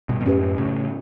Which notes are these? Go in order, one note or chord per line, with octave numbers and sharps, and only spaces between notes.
G2 B2
B2
F#2 A2 C#4 G4 B4
A2 C#3